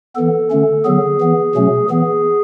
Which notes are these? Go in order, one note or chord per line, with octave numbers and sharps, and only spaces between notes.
E3 B3 A4
D3 A3 C#4
D3 F#3 B3 G#4
E3 B3
B2 F#3 A3 C#4
E3 B3 G#4